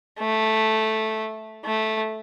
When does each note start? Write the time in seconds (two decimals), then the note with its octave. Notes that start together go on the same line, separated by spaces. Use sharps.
0.20 A3
1.65 A3